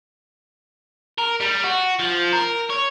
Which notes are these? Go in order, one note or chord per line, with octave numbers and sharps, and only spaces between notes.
A#4
G3
F#4
F3
A#4
C#5